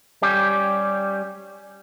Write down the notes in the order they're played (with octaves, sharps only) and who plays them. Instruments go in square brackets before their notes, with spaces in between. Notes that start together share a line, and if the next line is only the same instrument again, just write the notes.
[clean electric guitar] G3 C#4 G4